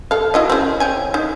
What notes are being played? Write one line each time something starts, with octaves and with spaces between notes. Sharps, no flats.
A4 F5
E4 F#4 D#5
C#3 C4
C#5 G5 G#5
D#4